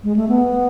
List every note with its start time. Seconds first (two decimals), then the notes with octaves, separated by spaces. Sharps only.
0.04 G#3
0.16 A3
0.29 B3